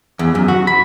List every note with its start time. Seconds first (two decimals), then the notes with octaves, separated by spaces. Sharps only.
0.19 E2
0.35 F#2
0.48 F#4
0.67 B5